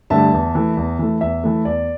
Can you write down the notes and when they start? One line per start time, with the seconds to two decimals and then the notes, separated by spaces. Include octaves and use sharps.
0.10 G2 D3 A3 E5 A5
0.33 E2
0.55 E3 A3
0.77 E2
0.99 E3 A3
1.21 E2 E5
1.44 E3 A3
1.65 E2 D5